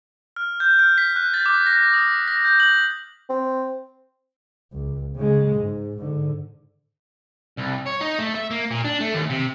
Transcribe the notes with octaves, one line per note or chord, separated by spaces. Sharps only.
F6
G6
F6
B6
F#6
A6
D6
A#6
D#6
A#6
G6
F#7
C4
C#2
C#3 G#3
G#2
G#2 D3
C2
C#5
D#4
A3
E5
A#3
A#2
D4
A3
D#2
C3